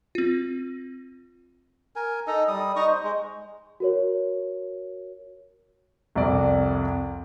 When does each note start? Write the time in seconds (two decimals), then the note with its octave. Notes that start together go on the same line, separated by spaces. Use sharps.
0.15 C4 F4
1.96 A#4 G#5
2.27 D#4 A4 D#5
2.48 G3 D#6
2.76 D#4 D#5 C#6 D#6
2.87 C5
3.03 G#3
3.80 F#4 A#4 C#5
6.15 C2 F2 C3 D5